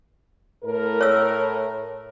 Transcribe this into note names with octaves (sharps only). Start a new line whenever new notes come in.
A2 A#4
C#5 E6